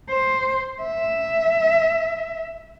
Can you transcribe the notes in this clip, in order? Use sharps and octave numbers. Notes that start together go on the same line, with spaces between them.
C5
E5